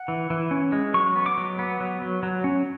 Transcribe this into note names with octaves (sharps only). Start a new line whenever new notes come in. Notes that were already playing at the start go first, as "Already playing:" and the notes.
Already playing: F#5
E3
E3
C#4
G#3
F#3 C#6
B3
D6
F#3
B3
F#3
F#3
F#3
C#4